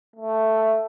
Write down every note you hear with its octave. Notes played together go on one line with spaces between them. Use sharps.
A3